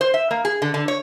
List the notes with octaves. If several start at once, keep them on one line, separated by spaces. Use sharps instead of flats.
C5
E5
A#3
G#4
D3
D3
C#5